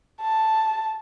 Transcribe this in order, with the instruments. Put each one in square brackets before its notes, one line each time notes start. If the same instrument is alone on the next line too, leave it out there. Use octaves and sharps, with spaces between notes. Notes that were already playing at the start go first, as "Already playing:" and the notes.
[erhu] A5